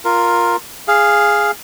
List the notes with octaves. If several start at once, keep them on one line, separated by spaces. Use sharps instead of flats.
F4 A#4
G#4 F5